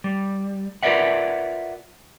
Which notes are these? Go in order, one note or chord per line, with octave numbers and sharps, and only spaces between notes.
G3
F4 A#4 B4 D5 E5 F#5